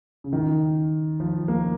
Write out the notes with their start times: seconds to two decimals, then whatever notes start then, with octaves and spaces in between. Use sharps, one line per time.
0.24 C#3
0.33 D#3
1.20 F3
1.48 A#3